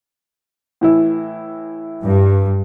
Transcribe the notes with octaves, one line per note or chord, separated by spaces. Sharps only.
A2 E3 E4
G2